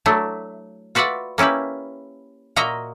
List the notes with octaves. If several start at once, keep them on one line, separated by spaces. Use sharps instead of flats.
F#3 A3 D4 E4
F4 F#4 B4 D5 E5 F#5
A#3 C#4 E4 G4 B4
A#2 A#3 F#4 D#5 E5 A#5